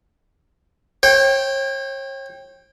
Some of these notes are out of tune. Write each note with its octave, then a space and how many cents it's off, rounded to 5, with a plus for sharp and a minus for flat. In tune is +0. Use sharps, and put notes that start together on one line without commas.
C#5 -40 G5 +0